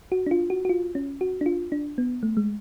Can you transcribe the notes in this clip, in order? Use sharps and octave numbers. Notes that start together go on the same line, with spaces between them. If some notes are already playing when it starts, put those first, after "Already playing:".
F#4
D4
F4
F#4
F#4
F4
C#4
F#4
D4
F4
D4
B3
A3
G#3